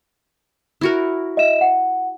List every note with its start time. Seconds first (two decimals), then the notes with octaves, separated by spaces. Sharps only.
0.81 E4 F#4 A#4
1.37 D#5 E5 E7
1.61 F#5